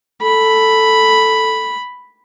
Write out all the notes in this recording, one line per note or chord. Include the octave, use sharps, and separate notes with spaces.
A4 B5